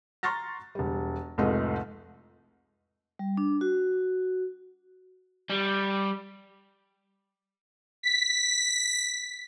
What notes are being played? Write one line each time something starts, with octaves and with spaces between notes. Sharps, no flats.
A#5 C6 C#6 F6 A6 A#6
E1 G3
F1 C2 A2 G#3 F4 D#5
G3
D4
F#4
G3
B6